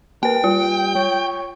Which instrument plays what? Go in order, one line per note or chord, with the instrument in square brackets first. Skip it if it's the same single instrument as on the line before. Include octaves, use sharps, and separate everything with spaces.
[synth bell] A#3 B4 [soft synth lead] A#4 [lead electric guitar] G5
[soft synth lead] G3 [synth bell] F4
[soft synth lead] C#5